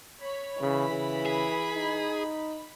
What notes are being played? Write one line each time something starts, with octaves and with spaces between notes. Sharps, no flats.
C#5 B5
C#3 E3 B5
C#3
G#4
D#4